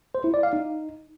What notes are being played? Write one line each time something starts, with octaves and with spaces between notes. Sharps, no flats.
C5
E4
D5
F5
D#4